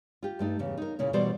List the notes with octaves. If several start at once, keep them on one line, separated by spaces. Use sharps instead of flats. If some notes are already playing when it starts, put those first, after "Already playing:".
F4 G4
G2 A3 D#4
E2 C#3
D#4 A#4
A#2 C#3 C#4 E4
B2 E3 G3 F#4 C5 D5